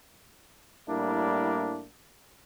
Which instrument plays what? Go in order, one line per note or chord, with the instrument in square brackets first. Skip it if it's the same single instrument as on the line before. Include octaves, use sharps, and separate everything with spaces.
[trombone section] A2 G3 A#3 D4 E4